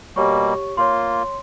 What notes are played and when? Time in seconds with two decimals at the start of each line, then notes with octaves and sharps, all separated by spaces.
0.16 B2 G3 A#3 G4 C#5 C#6
0.77 A#3 F4 C#5 C6